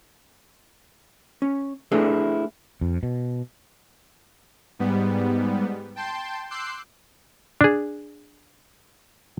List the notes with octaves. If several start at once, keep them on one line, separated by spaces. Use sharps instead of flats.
C#4
A3 D4 E4 G#4 A4 B4
F2
B2
G#2 G3 B3
G5 A5 C6 G6
C6 D6 E6 F#6 G6 C7
D4 G#4